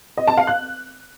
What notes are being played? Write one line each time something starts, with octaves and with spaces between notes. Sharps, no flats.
D#5
A5
F5
F#6